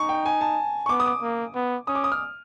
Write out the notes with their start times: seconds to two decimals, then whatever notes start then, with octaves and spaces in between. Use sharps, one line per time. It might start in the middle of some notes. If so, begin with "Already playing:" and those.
Already playing: D#4 C#6
0.09 G5
0.26 G#5
0.41 A5
0.86 C#6
0.89 B3 D6
1.00 D#6
1.06 D6
1.22 A#3
1.55 B3
1.87 C#4 D#6
1.95 D6
2.04 D#6
2.12 F6